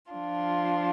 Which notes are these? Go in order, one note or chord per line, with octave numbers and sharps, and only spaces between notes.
F3 D4 F4